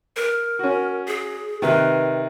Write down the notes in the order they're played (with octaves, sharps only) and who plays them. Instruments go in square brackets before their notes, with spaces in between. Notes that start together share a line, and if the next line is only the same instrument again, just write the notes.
[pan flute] A#4
[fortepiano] C#4 F#4
[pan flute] G#4
[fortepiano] C3 D#3 [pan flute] B4